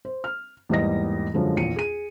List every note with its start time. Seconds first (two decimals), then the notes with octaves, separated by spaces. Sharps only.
0.05 C5
0.24 F6
0.69 E2 G#2 G3 A#3 D#5 A#6
1.34 F#2 D3 F3 G#3
1.57 A#1 E2 C#7 D#7
1.76 G#4 D#7